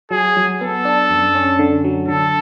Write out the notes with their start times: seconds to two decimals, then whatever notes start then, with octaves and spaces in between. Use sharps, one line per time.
0.11 F#3 G#4
0.36 F#3
0.61 B3 A4
0.85 D4
1.10 F#2
1.35 C#4
1.59 D3
1.84 F#3
2.08 D3 A4